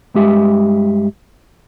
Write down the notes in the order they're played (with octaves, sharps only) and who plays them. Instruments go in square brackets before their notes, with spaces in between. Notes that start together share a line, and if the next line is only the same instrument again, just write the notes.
[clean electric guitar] G2 G#3 G4 E5